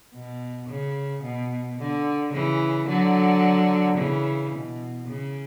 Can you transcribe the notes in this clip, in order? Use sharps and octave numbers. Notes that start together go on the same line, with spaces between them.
B2
C#3
B2
D3
C#3 E3
D3 F#3
C#3 E3
B2
C#3